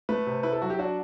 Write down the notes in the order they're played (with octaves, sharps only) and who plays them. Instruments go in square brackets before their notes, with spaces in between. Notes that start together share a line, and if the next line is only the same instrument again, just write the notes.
[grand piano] A3 B4
C3
E4 B4
A4
F#3 F#4
G4
D4 F#4